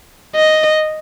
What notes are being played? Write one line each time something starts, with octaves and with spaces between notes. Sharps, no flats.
D#5